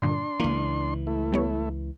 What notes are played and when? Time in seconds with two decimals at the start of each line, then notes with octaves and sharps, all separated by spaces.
0.02 G2 A#2 D3 D4 C6
0.40 C#2 E3 A#3
1.07 A3 E4
1.32 G3 B3 C#5